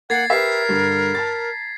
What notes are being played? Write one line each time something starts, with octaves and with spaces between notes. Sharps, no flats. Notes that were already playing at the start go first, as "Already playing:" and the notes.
A#3 F#5 G#6 A6 C7
G4 A#4 B4 E5 B6 C7
G2 D3
A5 A#5 A6